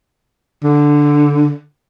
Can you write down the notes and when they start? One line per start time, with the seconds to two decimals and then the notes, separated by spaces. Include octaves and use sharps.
0.64 D3